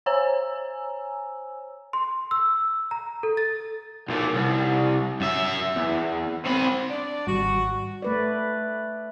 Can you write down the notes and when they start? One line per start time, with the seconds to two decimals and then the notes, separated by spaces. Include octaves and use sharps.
0.06 C5 C#5 G#5 A#5 E6
1.93 C6
2.31 E6
2.91 A#5
3.23 A4
3.37 A6
4.09 B1 A#2
4.35 C2
5.20 F#2 E5
5.76 E2
6.46 C4 B5
6.90 D4 D5
7.27 G#1 G3 F#4
8.02 A3 B4 D5